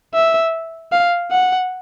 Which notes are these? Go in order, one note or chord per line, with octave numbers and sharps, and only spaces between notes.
E5
F5
F#5